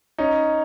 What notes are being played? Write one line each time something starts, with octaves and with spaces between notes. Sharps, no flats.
C#4 D#4